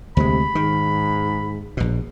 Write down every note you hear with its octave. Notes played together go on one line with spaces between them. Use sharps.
D2 C3 G#3 B5
G#2 D#3
A#1 B2